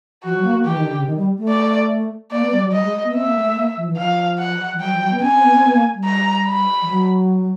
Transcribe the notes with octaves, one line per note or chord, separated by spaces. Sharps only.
F3 F#4
F#3
A#3
A#3
E3 G4
D#3
D3
C#3
D#3
G3
A3
D5
A#3 D5
B3
G3
F#3
G3 D#5
G#3
B3
C4 E5
A#3
A3
A3
A#3
F3
E3
F3 F5
F#5
F3
F#3 G5
F3
F#3
B3
C#4 G#5
C4
B3
C4
B3
A#3
G3
A#5
B5
F3
F#3